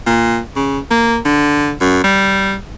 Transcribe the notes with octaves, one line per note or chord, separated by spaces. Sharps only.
A#2
C#3
A#3
D3
F#2
G3